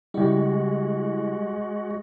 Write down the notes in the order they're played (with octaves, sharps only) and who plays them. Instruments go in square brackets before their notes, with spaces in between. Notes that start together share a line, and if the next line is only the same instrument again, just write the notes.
[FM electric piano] C#3 E4 [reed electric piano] G3 G4 [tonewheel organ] G#3 F#4